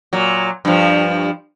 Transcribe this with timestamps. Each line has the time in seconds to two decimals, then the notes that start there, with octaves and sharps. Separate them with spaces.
0.13 A#2 F#3
0.65 G2 F3